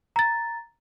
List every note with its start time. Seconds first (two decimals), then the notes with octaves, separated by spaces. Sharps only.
0.16 A#5 A6